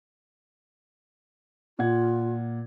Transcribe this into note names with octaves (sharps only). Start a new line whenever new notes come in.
A#2 F4 F#5 G#6